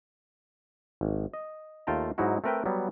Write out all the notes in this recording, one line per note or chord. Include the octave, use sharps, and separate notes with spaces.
G#1
D#5
D#2 A3 F4 G5 A5 A#5
G#2 F#3 D#4 E4 F#4
A3 C4 A#4 B4 E5 G5
F#3 G3 B3